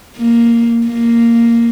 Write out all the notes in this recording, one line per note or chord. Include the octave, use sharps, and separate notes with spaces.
A#3
A#3